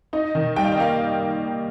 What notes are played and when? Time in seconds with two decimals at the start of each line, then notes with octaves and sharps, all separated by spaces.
0.13 D#4 D#5
0.35 D#3
0.56 G3 G5
0.64 F5
0.72 D#5
0.78 A#3 F5